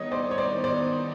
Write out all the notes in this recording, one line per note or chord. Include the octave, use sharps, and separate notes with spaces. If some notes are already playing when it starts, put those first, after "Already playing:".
Already playing: D#3 G3 B3 D#4 C#5 D#5
C5 D5
C#5
C5 D5
C5 D5